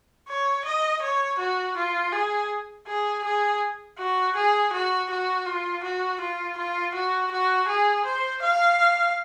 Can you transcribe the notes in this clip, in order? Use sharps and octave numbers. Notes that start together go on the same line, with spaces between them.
C#5
D#5
C#5
F#4
F4
G#4
G#4
G#4
F#4
G#4
F#4
F#4
F4
F#4
F4
F4
F#4
F#4
G#4
C5
F5